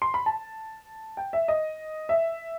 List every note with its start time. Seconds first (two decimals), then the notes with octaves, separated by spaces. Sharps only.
0.02 C6
0.14 B5
0.26 A5
1.17 G5
1.33 E5
1.48 D#5
2.09 E5